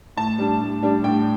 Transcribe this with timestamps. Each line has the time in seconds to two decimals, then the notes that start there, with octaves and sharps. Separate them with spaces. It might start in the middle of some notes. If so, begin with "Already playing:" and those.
0.17 A2 A5
0.38 G3 D4
0.61 A2
0.83 G3 D4
1.04 A2 G5